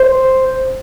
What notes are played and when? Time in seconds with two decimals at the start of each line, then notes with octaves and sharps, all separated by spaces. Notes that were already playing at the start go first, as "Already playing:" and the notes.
Already playing: C5